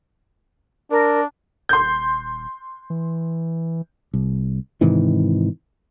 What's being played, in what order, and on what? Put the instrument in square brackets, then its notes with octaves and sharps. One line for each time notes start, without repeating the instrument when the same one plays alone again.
[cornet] D4 [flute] A#4
[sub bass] D#1 [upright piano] C6 G6
[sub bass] E3
[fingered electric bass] C2
G#2 C3 D#3 E3